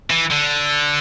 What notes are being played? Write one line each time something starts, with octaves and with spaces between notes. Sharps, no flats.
E3
D3